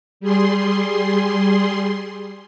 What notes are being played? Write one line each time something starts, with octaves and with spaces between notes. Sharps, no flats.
G3 G#4 C6